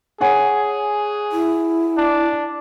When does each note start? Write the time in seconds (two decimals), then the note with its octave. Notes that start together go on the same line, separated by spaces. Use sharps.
0.21 G#4 C#5 F#5 G#5
1.32 E4
1.97 D4